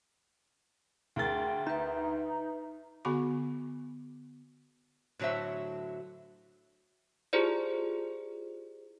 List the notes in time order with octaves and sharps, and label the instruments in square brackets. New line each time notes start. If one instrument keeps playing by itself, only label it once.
[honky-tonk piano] D2 A#4 A6 [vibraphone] G#4 G5
[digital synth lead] D#4 [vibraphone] B4 E5
[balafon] D3 B3 F#4 B5 D6
[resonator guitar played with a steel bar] A2 D3 F#3 C5 E5
[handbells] E4 F4 G4 G#4 C5 D5